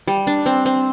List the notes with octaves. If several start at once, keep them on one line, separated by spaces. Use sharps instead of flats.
G3
D4
C4
C4